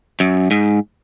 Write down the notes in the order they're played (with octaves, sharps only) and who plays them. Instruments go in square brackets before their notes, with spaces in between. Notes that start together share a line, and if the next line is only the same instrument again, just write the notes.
[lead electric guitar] F#2
G#2